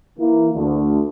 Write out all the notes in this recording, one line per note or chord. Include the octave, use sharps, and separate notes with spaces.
E3 A#3 E4
D2 D3